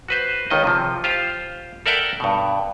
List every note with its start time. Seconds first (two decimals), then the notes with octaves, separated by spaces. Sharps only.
0.08 F#4 B4 C5
0.50 C#2 D#3 D#5
0.64 C3 F3
1.04 F4 G4 C5 F5
1.86 A4 A#4 D5 E5 F#5 G5
2.20 G2 B2